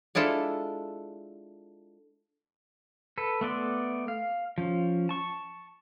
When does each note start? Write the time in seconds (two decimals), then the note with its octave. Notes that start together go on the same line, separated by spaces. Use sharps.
0.15 G#3 D4 E4 F4 A4
3.18 A4 B4
3.41 A3 B3 D5 C6
4.08 F5
4.58 F3 C#4
5.09 A5 C#6